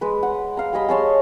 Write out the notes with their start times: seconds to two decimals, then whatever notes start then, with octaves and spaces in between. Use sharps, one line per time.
0.01 G#3 B4
0.23 F#5
0.57 F5 A#5
0.73 G3 G#4 D#5 B5
0.89 G#4 C#5 A5 C6